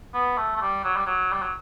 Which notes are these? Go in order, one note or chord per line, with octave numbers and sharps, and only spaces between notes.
B3
A3
A3
G3
F#3
G3
F#3
G3
F#3